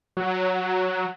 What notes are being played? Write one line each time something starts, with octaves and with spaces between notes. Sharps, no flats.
F#3